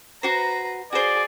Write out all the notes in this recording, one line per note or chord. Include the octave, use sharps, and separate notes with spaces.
F#4 B4 C5 A#5
F#4 G#4 C5 D5